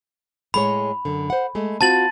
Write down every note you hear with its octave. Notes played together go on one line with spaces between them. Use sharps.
A2 G#3 C#5 B5
F#2 D3
C5 F#5
G#3 A3 G#4
C4 F4 F#4 A5 A6 F#7